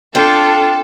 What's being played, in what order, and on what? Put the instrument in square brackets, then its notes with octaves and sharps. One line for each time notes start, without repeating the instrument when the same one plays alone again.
[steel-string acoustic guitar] C4 G5 [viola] D4 F4 [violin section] A4